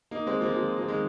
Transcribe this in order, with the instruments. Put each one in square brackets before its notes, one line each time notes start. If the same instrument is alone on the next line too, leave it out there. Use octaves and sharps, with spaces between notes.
[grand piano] A#3 D#4
G#3 C4
F3 A#3
G#3
F3
F3 A#3
D#3 G#3